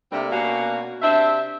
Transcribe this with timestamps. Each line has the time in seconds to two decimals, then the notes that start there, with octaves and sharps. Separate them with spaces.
0.12 C3 G3 A3 A#3 C4 D4
0.32 B2 A#3 C#4 D4 F#4
1.02 C3 D4 C5 E5